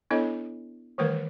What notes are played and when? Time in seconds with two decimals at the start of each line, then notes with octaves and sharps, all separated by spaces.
0.11 B3 D4 E4 A4 C#5 D#5
0.98 D#3 E3 G3 A3 A#4 B4